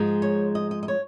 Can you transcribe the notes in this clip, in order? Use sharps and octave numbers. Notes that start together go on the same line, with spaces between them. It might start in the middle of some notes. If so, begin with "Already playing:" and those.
Already playing: G#2 F3 G#3 D#4
C#5
D#5
D#5
D#5
C#5